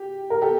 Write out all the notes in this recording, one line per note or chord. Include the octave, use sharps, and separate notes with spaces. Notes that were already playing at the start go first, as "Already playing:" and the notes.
Already playing: G4
A#4
G4 A4